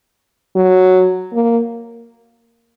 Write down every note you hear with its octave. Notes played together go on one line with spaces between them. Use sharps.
F#3
A#3